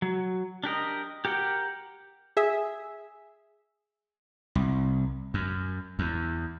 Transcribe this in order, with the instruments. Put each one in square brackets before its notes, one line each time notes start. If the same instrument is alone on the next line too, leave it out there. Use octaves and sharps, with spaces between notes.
[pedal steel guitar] F#3
D4 G4 A#4 D#5
G4 A#4 F#5 G5
[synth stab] G#4 E5
[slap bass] C2
F#2
E2